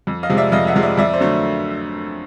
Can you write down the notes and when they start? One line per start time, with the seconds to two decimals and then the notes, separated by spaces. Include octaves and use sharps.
0.07 F2
0.23 D#5 F5
0.29 C3 F3 G#3
0.37 D5 E5
0.52 F2 D#5 F5
0.67 E5 F#5
0.75 C3 F3 G#3
0.82 D5 E5
0.97 F2 D5 E5
1.14 C5 D5
1.21 D3 F#3 A3